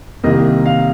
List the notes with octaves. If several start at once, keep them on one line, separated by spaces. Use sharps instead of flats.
C2 C3 D#3 A#3 D#5
F5